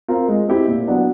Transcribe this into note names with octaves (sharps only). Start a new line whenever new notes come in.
C4 F4 A#4
G#3
C4 E4 G4
A#2
F#3 B3 D4